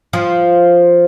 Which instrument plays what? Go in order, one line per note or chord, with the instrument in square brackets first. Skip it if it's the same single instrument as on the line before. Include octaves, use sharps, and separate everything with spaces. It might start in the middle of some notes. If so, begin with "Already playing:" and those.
[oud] F3